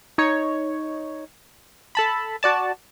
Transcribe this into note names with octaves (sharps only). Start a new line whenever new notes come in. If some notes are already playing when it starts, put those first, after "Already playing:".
D#4 C#5
A4 A5 B5
F#4 D5 A5